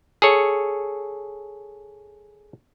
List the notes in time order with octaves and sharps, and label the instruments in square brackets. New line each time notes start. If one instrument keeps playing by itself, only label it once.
[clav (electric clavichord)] G#4 A4 C#5